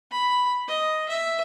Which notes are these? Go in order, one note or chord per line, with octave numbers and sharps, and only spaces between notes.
B5
D#5
E5